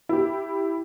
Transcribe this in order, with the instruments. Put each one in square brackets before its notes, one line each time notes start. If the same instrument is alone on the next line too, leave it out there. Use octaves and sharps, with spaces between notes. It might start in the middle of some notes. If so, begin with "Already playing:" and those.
[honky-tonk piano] E4 G4